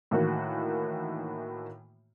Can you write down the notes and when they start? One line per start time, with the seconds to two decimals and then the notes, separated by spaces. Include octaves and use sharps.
0.11 A2 D#3 E3 A#3 F#4